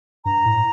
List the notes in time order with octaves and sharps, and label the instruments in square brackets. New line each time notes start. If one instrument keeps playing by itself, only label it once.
[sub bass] G2 [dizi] A#5
[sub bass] A2